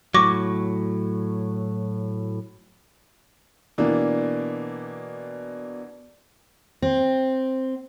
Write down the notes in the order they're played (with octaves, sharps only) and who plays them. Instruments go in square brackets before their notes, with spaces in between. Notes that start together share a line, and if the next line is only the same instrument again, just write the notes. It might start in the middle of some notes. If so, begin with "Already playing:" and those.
[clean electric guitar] A2 F#3 [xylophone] C#6 D6 A#6
[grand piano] B2 E3 A#3 D4
[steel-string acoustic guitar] C4